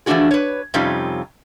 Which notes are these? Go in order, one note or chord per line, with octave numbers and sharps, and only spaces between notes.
E3 F3 A3 D4 F#4 G#4
B4 C#5
F2 C3 G3 C#4 D#4 F4